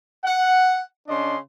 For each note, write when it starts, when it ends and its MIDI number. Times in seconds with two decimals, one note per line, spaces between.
0.24 0.80 78
1.08 1.37 49
1.08 1.37 61
1.08 1.37 62
1.08 1.37 75
1.08 1.37 84